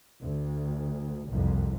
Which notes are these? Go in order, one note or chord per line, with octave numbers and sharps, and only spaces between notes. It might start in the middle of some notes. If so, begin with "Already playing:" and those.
D2
F#1 C2 F2